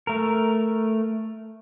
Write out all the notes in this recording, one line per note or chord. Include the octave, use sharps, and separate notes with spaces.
A3 A#4